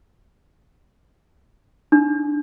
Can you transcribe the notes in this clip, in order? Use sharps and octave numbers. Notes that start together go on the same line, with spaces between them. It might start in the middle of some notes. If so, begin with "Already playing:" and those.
D4